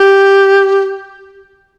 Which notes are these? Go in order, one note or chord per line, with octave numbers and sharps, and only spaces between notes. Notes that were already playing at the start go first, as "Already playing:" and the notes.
Already playing: G4